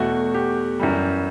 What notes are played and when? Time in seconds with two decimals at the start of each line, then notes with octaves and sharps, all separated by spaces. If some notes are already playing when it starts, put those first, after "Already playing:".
Already playing: E2 B2 A3 F#4
0.34 G4
0.79 F#2 E3 G3